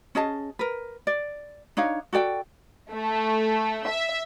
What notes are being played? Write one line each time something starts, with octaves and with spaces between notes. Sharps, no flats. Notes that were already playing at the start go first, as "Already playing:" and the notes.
C#4 G#4 D#5 A5
A#4 B4
D5
D4 D#4 C#5 F5
F#4 A4 D5 G5
A3
E5